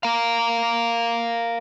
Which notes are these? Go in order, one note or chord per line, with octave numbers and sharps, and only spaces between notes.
A#4 F5